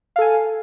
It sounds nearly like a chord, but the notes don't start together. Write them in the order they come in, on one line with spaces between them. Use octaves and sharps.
F5 A4 G#5